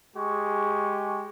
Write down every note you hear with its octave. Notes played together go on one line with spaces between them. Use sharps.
G#3 G4 G#4 C#6